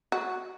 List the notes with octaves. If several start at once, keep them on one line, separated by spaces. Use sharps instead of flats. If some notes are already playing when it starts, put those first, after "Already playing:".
F#4